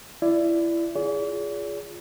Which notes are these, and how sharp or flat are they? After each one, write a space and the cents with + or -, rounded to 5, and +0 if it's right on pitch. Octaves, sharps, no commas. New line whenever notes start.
E4 +25 D5 +0
F4 +0 G#4 +0 D5 -45